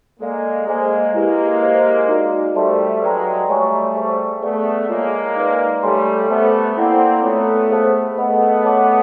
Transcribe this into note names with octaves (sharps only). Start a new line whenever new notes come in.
G#3 A#3 A4 D5 F5
G#3 A#3 G#4 C5 D#5 G#5
G#3 A#3 E4 G4 B4
G4 C5 D#5
D#4 F#4 A#4 D5
G3 A3 A4 C5 E5 A5 C6
F#3 G#3 B4 D5 G5 A#5
G3 A3 C#5 F5 G#5 C#6
G#4 C5 F5 A5 C#6
A3 B3 G#4 B4 D5 F5
G#3 A#3 F4 G#4 C#5 F5
D#4 G#4 B4 D5
G3 A3 A4 C#5 F5 G#5 C6
A3 B3 C5 E5 A5 D6
A#3 C4 E4 A4 D5 F#5
A3 B3 F4 A4 C#5
G#4 C5 F5 A5
A3 B3 G#4 B4 D#5 F#5 B5
C#5 F#5 A5 D6